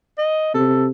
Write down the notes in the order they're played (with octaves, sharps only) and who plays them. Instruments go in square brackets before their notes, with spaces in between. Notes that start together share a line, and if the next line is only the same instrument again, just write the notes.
[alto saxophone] D#5
[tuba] C3 [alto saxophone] A4